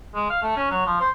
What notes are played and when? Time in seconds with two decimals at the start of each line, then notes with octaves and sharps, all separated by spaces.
0.15 G#3
0.30 F5
0.42 A3
0.56 C#4
0.70 F#3
0.86 F3
1.00 C5